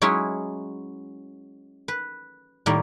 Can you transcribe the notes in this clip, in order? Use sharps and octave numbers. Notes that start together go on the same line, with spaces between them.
F#3 G#3 C#4 E4 F#4 G#4
B4
A2 D#3 G3 A#3